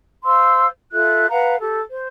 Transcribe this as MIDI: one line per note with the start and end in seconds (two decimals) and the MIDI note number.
0.25 0.66 72
0.25 0.66 77
0.25 0.66 84
0.25 0.66 88
0.91 1.26 65
0.91 1.26 69
0.91 1.26 76
0.91 1.26 90
1.28 1.54 71
1.28 1.54 77
1.28 1.54 78
1.28 1.54 82
1.59 1.80 67
1.59 1.80 69
1.91 2.07 72